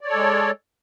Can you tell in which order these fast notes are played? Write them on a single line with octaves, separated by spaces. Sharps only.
D5 C#5 A4 G#3